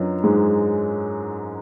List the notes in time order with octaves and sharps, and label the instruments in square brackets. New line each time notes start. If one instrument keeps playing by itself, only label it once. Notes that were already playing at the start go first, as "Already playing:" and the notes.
Already playing: [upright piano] F#2 F#3 [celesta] D4 F4 B4 D#5
[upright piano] G#2 G#3